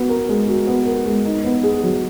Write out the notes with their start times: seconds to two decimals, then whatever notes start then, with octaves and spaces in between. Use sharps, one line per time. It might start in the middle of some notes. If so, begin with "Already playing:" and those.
Already playing: B3 F#4
0.09 A#4
0.29 G#3
0.48 F#4
0.67 B3
0.86 A#4
1.06 G#3
1.25 D#4
1.44 B3
1.64 G#4
1.84 F#3